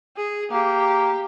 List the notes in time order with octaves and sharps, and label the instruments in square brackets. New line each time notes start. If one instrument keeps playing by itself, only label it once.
[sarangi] G#4
[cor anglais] A#3 [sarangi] G4